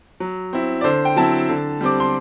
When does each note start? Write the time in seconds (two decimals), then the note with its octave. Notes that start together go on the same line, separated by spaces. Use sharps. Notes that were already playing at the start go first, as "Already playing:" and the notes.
0.20 F#3
0.53 C4 E4
0.81 D5
0.84 D3 C5
1.05 G5
1.16 F#3 C4 E4 A5
1.49 D3
1.81 G3 C4 D6
2.00 C6